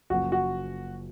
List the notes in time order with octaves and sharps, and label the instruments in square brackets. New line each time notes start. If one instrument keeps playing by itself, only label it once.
[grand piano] F#1 F#2 F3 A#3 [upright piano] F#4
[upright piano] F#4